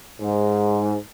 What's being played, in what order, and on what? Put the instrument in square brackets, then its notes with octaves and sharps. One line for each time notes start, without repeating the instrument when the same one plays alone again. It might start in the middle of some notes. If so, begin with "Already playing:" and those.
[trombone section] G#2